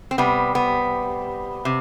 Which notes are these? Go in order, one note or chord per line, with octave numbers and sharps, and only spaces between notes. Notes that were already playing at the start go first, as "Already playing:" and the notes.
C4
C3 G3 B3
B3
C3